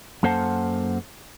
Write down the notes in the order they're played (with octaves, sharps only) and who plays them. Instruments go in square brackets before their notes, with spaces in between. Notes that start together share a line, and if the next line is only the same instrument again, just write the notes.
[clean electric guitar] F#2 A#3 A4 C5 F#5 A5